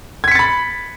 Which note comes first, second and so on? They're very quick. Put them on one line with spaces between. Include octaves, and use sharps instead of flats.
G#6 B6 C#7 A6 B5